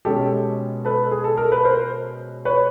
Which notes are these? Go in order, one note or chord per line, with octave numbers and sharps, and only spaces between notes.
B2 G#3 C#4 G4 A4
A4 B4
G#4
A4
A#4
B4
A#4 C5
B4 C#5